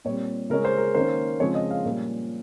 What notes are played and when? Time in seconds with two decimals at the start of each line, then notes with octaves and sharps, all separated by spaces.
0.05 A#2 G3 C4 C#5
0.50 C#3 G#3 C#4 A#4
0.65 C5
0.78 A#4
0.95 D#3 A#3 C#4 C5
1.40 C#3 F3 G#3 C4 C#5
1.55 D#5
1.71 F5
1.85 A#2 G3 C#4